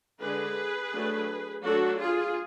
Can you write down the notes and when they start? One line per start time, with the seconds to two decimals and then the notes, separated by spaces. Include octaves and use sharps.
0.21 D3 G#3 D4 G#4 B4
0.93 F#3 A3 D4
1.64 F#3 A3 D4 F#4 A4
2.00 F4 G#4